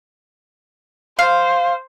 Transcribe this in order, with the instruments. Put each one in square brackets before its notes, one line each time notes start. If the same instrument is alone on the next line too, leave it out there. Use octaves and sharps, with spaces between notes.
[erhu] C5 [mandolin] F5